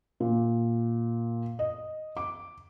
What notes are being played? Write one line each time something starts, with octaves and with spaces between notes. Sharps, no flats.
A#2
D#5
D6